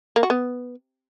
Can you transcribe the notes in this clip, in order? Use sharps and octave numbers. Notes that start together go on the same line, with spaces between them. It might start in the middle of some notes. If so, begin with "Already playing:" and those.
A#3
F#4
B3